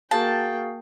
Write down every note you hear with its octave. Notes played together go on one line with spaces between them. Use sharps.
A#3 F#4 G#4 F5 G5 A5